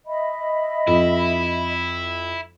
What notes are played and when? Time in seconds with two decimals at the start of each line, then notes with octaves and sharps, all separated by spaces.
0.07 D#5 E5 B5
0.87 F2 E4